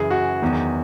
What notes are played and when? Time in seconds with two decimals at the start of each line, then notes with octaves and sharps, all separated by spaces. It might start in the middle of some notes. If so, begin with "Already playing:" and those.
Already playing: F#2 C#3 E3 G#4
0.10 F#4
0.42 E2 D#3 F#3